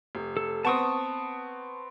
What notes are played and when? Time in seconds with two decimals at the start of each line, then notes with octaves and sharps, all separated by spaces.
0.15 F1
0.37 A4
0.65 B3 C4 A5 C#6 D#6